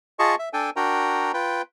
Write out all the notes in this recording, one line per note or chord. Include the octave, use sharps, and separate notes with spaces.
F4 G#4 D#5 A5 C#6
E5
D4 A4 G5 G#5
D4 F#4 A#4 G5 A#5
F4 B4 G5